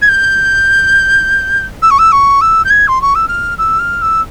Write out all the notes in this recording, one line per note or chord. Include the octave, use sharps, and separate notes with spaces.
G#6
G6
E6
C#6
E6
C#6
E6
G6
G#6
C6
C#6
E6
F6
E6
F6
E6